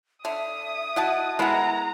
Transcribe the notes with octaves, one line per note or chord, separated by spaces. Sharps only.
D3 E5 D#6
E4 F#4 D#5 F#5 A5
G#3 B3 E4 A#4 F#5 A#5